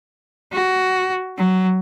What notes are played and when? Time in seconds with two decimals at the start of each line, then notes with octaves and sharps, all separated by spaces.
0.52 F#4
1.37 F#3